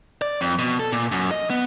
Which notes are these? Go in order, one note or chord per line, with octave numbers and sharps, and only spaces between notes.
D5
F2
B2
A4
A#2
F#2
D#5
B3